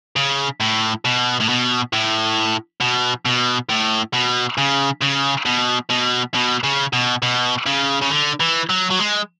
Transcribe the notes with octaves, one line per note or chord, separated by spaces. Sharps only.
C#3
A2
B2
A2
B2
A2
B2
B2
A2
B2
C#3
C#3
B2
B2
B2
C#3
B2
B2
C#3
C#3
D3
E3
F#3
F#3
G#3